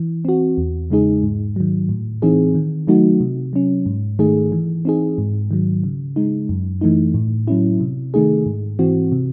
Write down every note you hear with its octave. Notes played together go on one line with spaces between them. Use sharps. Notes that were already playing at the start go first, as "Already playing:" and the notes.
Already playing: E3
C4 F#4
E2
C#3 G#3 D#4 G#4
G#2
D#3 F#3
A2
E3 C4 D#4 G#4
D#3
F#3 A3 D#4 F#4
C3
F#3 C#4
G#2
D#3 A3 D#4 G#4
E3
C4 D#4 G#4
G#2
D#3 F#3
C#3
G#3 D#4
F#2
E3 A3 D#4
A2
F#3 C#4 E4
C3
D#3 A3 D#4 G#4
G#2
E3 C4 F#4
C3